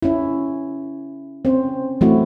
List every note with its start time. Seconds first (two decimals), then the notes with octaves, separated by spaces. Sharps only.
0.02 C#4 E4
1.45 C4 C#4 C5
2.01 E3 F#3 A3 C4 E4 F#4